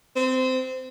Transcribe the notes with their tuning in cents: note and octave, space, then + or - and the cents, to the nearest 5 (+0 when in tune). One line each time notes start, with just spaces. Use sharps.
C4 -20